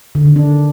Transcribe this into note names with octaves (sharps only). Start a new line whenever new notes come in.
D3
D#3
D4